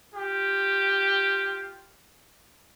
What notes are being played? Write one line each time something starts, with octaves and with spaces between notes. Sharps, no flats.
F4 G4